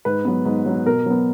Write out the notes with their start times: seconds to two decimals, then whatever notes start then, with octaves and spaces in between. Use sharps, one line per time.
0.05 G#2 B4
0.25 F#3 B3
0.45 G#2
0.66 F#3 B3
0.86 B2 A#4
1.06 F#3 B3